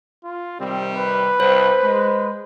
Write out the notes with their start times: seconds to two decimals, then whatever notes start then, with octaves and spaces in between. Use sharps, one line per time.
0.24 F4
0.60 C3 D#3 G3 C4
0.98 B4
1.40 C2 C5
1.83 G#3